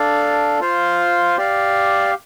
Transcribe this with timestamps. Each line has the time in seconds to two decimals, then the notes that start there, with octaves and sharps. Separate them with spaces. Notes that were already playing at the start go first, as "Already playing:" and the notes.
Already playing: D4 A4 D5 F5
0.60 F4 C5 F5
1.37 G4 D5 F5